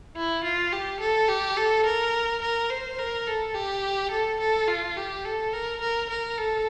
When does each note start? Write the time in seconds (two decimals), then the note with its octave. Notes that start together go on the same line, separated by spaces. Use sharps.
0.16 E4
0.44 F4
0.72 G4
1.00 A4
1.28 G4
1.57 A4
1.85 A#4
2.42 A#4
2.70 C5
2.98 A#4
3.27 A4
3.55 G4
4.11 A4
4.40 A4
4.68 F4
4.97 G4
5.25 A4
5.53 A#4
5.81 A#4
6.09 A#4
6.38 A4